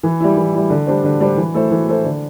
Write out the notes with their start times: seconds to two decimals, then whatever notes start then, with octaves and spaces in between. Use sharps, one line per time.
0.03 E3
0.20 G3 E4
0.37 E3
0.54 G3 E4
0.70 D3
0.87 G3 D4 C5
1.04 D3
1.20 G3 D4 C5
1.37 E3
1.54 A3 E4 A4 C5
1.71 E3
1.87 A3 E4 A4 C5
2.04 D3